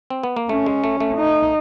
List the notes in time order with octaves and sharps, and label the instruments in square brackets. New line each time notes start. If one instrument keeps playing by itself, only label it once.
[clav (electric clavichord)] C4
B3
A#3
[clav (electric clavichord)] A3 [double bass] C#4
[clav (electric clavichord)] G#3
A3
A3
[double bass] D#4